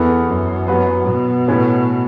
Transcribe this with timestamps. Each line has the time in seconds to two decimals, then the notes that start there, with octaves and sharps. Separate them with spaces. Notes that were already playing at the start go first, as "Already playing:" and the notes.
Already playing: E2 E3 B3 E4 A4
0.28 F#2
0.68 F#3 B3 F#4 B4
1.08 B2
1.48 A2 A3 C#4 E4 B4